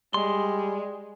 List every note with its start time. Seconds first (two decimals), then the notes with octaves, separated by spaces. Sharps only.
0.14 G3 G#3 C6